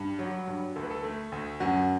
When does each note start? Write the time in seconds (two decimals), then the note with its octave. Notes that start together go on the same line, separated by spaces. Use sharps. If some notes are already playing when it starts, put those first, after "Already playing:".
Already playing: G2
0.19 F#3
0.47 G2
0.76 D2 A4
0.83 B4
0.91 A4
1.04 A3
1.32 D2
1.60 F#2 F#4